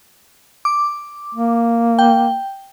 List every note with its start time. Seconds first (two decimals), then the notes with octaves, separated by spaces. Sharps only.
0.65 D6
1.35 A#3
1.99 G5